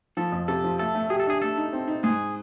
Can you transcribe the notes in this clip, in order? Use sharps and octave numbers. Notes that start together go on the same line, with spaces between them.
F3 A4
F2
C3 A4
F3
A3 A4
A3
G4 G#4
A4
D4 G#4
A3 A4
D#4
C4
D#4
G#2 G#4